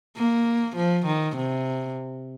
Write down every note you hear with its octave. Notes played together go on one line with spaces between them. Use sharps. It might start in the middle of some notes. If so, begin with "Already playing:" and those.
A#3
F3
D#3
C3